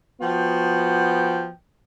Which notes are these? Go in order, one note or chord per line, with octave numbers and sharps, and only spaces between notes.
F3 B3 F#4 G5